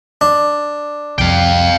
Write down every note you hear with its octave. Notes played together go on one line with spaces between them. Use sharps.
D4
C2 F2 C3 F5 G5